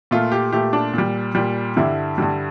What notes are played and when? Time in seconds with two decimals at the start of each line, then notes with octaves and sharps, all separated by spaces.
0.11 A#2 A3 F4
0.32 G4
0.52 A#2 A3 G4
0.73 D4
0.94 A#2 G3
1.35 A#2 G3
1.76 G2 D3 G3 E4
2.18 G2 D3 G3